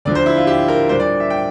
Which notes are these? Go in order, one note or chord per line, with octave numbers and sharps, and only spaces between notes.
D2 D3 F3 D5
C5
E4
F4
G4
A#4
A#2 G3 D4 C5
D5
E5
G5